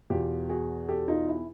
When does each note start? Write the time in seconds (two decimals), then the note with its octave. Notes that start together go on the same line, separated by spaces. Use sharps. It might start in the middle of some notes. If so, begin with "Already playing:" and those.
0.10 E2 B2 F4 G4
0.49 F#4 G#4
0.89 G4 A4
1.08 D#4 F4
1.28 E4